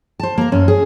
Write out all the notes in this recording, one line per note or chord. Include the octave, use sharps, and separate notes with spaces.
C5 A5
A#3 A#4
F#2 C#4
G#4